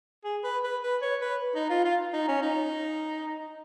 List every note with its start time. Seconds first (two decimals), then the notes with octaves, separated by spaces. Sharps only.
0.24 G#4
0.44 B4
0.64 B4
0.83 B4
1.02 C#5
1.22 B4
1.55 D#4
1.70 F4
1.84 F4
2.13 D#4
2.28 C#4
2.42 D#4